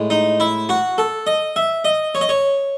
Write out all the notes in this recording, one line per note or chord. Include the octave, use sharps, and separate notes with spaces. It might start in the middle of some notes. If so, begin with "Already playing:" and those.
Already playing: A2 G#3
D#4
E4
F#4
A4
D#5
E5
D#5
C#5
D#5
C#5